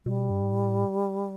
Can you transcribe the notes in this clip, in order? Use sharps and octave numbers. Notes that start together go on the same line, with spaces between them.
B2 G3
G2
G#2
A2